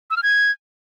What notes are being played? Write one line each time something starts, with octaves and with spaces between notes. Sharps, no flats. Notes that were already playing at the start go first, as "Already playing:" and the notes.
E6
F6
G#6